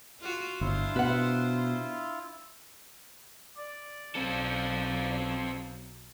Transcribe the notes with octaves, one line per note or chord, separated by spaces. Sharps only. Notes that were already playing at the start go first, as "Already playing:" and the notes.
F4 F#4
G1 D4 E4 F4 C5
B2 B4 F#5
D5
B1 F#3 C4 A4